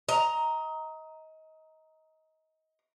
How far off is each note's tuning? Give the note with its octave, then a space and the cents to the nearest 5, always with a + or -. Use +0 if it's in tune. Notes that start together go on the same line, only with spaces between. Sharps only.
D#5 +25 A#5 +0